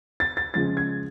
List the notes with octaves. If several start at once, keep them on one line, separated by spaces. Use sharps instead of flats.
A6
A6
C#3 F3 G#3 A6
G#6